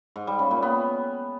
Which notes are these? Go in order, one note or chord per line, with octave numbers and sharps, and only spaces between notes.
G#2
G3
C#3
A#2
B3